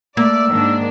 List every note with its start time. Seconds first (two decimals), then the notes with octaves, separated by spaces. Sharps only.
0.17 A3 A#3 D5 E6
0.50 G#2 D#3 D4